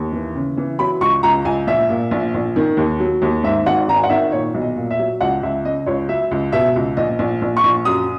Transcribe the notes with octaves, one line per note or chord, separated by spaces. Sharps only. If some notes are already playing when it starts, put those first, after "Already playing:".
Already playing: D#2
E3
C#3
E3
F#3 B5
C#2 C#6
C#2 A#5
C#2 G#5
A#1 E5
A#2
A#1
A#1
D#3
D#2
F#3
D#2
G#2 E5
G#1 F#5
G#1 A#5
G#5
F#5
D#3 E5
A#2 C#5
B1
D#5
A#2
E5
F#3
C#2 F#5
C#2 E5
C#3 D#5
C#2 C#5
F#3 E5
C#2
B2 E5
C#2
A#1 D#5
A#1
A#1
C#6
A#1
F#2 D#6